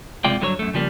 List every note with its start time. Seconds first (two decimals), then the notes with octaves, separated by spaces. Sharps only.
0.24 C#2 C3 G#3 F4 D5 G5
0.41 G2 D3 F#3 A#4 C#5
0.59 F#2 A3
0.74 C#3 F3 G3 A#3